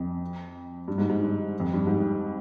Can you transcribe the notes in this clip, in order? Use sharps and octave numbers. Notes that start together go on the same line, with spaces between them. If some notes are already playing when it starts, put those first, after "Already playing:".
Already playing: F2
G2
G#2
G#2
G2
F2
G2
G#2